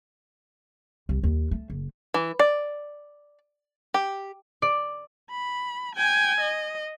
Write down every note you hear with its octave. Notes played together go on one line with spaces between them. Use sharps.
C2
D#2
A3
F#1
E3
D5
G4
D5
B5
G5 G#5
D#5